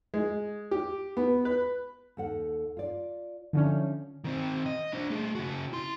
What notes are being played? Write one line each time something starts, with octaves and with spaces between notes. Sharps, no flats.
G#3
G4
B3
B4
D#2 A4 F#5
F4 D5
D3 F3 C#4 D#4 E5
D#3 C4
D#5
D4 C5
A3 G#4
C#3 F#4
E4 C6